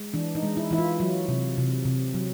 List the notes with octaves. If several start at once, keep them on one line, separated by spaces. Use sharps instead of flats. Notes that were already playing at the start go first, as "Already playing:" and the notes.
Already playing: G#3
E3 D4
D#4
G#3
E4
E3 E4
F4
F#3
C3
C3
C3
F#3